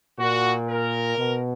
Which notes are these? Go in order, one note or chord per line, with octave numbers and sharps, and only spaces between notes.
A#2 F#4
A#4
B2